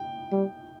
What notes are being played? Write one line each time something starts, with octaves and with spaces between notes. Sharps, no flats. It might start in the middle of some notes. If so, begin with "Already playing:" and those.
Already playing: G5
G3